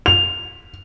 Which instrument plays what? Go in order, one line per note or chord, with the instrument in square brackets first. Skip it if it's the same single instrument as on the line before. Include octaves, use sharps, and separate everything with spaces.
[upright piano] F7